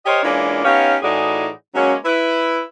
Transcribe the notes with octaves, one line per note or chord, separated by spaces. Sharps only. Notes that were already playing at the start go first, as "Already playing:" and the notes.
G4 A#4 C5 C#5 D#5
E3 G#3 A#3 C#4 D4 F4
B3 C#4 D#4 G4 C#5 F5
A2 E3 D#4 F#4 G#4 D5
F#3 G#3 A#3 C#4
E4 B4